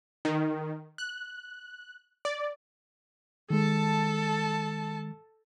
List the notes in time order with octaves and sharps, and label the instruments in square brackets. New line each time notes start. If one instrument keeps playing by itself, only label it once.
[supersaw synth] D#3
F#6
D5
[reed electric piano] D#3 G#3 [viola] A4 A5